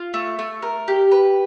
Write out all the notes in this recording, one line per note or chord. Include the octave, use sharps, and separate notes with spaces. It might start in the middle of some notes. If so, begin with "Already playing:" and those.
Already playing: F4
A3
A3
A#4
G4
B4